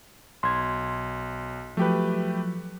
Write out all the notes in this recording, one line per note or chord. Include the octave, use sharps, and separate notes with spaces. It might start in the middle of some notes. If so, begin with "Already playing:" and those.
B1 C6 G#6
F3 F#3 A3 G4 B4